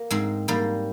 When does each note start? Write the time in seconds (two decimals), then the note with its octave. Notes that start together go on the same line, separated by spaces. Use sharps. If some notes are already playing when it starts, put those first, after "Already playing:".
Already playing: A#3
0.10 G#2 G#3 C4
0.48 G#2 G3 A#3